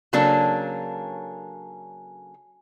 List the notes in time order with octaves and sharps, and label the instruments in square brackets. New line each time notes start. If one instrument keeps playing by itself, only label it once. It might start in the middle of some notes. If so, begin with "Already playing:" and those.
[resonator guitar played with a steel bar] C#3 F#3 A#3 C#4 D4 A4